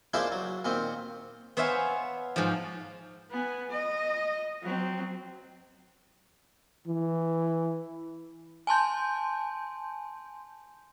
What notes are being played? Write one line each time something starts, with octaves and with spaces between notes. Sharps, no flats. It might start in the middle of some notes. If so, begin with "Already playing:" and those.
F3 G#3 A#3 D4 E4 C5
F#3
A#2 D#3 C4
B3 C5 C#5 E5 F5 G#5
G#2 F3
B3 G#5
D#5
F#3 C4
E3
G#5 A5 C6 G6